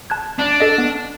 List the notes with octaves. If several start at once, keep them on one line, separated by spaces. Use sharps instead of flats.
A5 F#6 G#6
D4
A4 D#5
B3